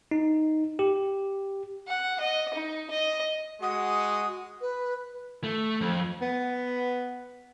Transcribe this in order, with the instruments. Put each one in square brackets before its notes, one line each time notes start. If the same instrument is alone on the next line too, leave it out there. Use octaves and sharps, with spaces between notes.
[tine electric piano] D#4
G4
[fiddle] F#5
D#5
D#4
D#5
[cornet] G#3 [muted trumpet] F#4 [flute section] F#5 [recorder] D#6
[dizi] B4
[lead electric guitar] A3
F2
[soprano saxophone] B3